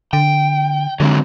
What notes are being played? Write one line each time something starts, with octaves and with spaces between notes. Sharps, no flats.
D3 G5
D3 F#3 G#3 C4